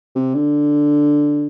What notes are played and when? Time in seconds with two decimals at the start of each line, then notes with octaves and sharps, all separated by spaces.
0.16 C3
0.35 D3